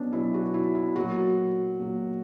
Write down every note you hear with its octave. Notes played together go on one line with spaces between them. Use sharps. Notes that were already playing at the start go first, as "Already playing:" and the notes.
Already playing: B2 F#3 B3 C#4 D4
B2 F#3 E4
F#4
E4
E4
A#2 F#3 F#4
A#2 F#3